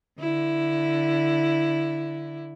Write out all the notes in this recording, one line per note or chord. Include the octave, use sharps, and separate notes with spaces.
D3 E4